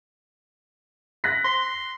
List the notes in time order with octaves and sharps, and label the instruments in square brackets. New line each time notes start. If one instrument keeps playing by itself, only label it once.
[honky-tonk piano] F#6 A#6 B6
[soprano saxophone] C6